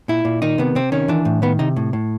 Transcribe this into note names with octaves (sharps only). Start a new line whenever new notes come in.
A#2 E4
A#2
D#3 D#4
C3 B3
C3 C4
D#3 C#4
E3 D4
A2
D#3 B3
C3 D#4
A2
A2